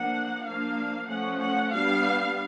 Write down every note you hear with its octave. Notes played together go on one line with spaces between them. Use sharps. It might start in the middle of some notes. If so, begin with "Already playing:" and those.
Already playing: F3 A#3 D4 F#5
F3 A#3 D4 F5
F3 A3 C#4 F#5
F#5
G3 B3 D4 F5